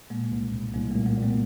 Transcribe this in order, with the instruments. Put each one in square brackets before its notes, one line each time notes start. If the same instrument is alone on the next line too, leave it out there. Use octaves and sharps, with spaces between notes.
[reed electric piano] A#2 [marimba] G#3 A#3
[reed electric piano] C2
C2
[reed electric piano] C2 [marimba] G#3 A#3
[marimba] G3 A3
[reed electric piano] A#2
[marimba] G#3 A#3
[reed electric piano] A#2 [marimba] A3 B3